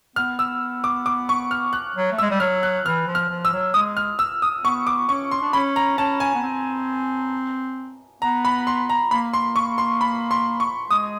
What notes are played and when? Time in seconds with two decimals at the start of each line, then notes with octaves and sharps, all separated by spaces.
0.16 B3 F6
0.39 E6
0.84 D6
1.06 D6
1.29 C#6
1.51 F6
1.73 F#6
1.96 F#3
2.12 A3
2.18 E6
2.22 G#3
2.31 G3
2.40 F#3 F6
2.63 F#6
2.85 E3 F6
3.07 F3
3.15 F6
3.29 F3
3.45 E6
3.53 F#3
3.74 G#3 D#6
3.97 F6
4.19 E6
4.42 D#6
4.64 B3 C#6
4.87 D6
5.09 C#4 C#6
5.31 C6
5.42 D4
5.53 C#4 B5
5.76 A#5
5.98 C#4 A5
6.20 G#5
6.35 B3
6.43 C4
8.22 B3 A#5
8.45 B5
8.67 C6
8.89 A#5
9.11 A#3 B5
9.33 C6
9.56 C#6
9.78 C6
10.01 B5
10.31 C6
10.60 C#6
10.91 G#3 D#6